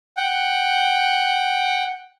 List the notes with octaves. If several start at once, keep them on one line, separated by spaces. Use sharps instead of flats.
F#5 G5